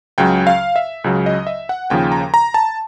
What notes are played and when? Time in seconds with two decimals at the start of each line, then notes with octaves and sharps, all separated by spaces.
0.18 C#2 C#3 F#3 G5
0.47 F5
0.76 E5
1.04 C#2 C#3 F#3
1.26 D#5
1.47 E5
1.69 F#5
1.90 D#2 C#3 F3 G5
2.12 A#5
2.34 A#5
2.54 A5